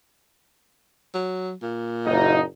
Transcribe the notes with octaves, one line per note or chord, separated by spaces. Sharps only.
F#3
A#2
F#1 D#4